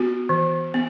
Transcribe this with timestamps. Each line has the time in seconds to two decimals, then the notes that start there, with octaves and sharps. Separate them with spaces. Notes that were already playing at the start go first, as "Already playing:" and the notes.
Already playing: B3 F#4
0.29 E3
0.74 B3